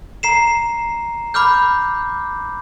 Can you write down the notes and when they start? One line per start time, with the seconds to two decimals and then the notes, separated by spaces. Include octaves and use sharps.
0.23 A#5 C7 E7
1.34 B5 D6 F6 G6